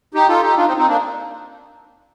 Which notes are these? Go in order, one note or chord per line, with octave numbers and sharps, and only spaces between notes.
D#4 G4
F4 A4
D#4 G4
D4 F4
C4 D#4
C4 D#4
A#3 D4